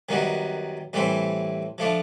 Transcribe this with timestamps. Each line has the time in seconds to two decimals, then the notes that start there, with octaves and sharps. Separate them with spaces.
0.09 F#2 D#3 G3 B3
0.93 A2 E3 G3 C4
1.78 F3 A3 D4